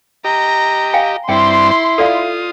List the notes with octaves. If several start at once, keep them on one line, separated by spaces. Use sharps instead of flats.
G4 D#5 A#5
F5 G5 G#5
G2 C4 E4 D5 G5 C6
F4 A4 D5 F5 D#6